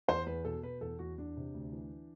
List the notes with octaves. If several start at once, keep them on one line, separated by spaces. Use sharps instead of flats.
E2 C5
E2 B4
B2 A4
B2 B4
E2 A4
E2 F#4
E2 D4
C3
D2
E3